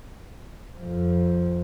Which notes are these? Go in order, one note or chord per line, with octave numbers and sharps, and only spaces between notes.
F2 F3